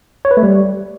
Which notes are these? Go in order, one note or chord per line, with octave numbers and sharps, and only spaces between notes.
C#5
B4
A3
G3